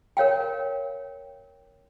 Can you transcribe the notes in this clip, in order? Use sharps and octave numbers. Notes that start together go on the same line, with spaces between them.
A#4 C#5 F5 G5